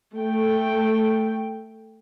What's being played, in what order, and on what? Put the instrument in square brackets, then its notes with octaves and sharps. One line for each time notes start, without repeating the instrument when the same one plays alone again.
[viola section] A3 G5